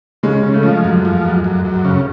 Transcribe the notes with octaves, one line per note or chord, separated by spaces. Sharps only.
C#3 G#3
C#3
A3
F3
F#2
F3
F#2
F#2
F#2
C#3